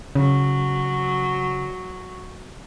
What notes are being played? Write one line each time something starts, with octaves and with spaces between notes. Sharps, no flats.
C#3 F#3